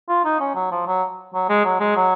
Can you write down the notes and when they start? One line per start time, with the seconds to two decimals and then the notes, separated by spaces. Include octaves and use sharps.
0.09 F4
0.25 D#4
0.40 C#4
0.55 F#3
0.71 F3
0.87 F#3
1.34 F#3
1.49 G#3
1.65 F#3
1.80 G#3
1.96 F#3